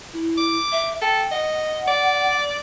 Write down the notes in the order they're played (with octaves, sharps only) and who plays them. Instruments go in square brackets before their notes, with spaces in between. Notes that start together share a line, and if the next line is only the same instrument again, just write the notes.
[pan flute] E4
[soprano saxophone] D6
[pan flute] E5
[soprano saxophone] A4 [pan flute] G5
[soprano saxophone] D#5 [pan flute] F#5
[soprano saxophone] D5